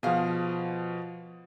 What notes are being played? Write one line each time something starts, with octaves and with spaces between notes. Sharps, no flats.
B2 F3 G#4 F5